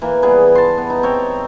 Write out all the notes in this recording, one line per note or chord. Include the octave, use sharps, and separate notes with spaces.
E3 A#3
G3 B3 G#4 B4
A5 C6
B3
D#4
C4 C#5 G5